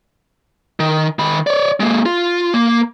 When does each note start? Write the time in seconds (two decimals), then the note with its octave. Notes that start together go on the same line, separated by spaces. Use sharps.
0.80 D#3
1.19 D#3 B5
1.47 C#5 D5
1.80 G#3 A#3
2.06 F4
2.54 A#3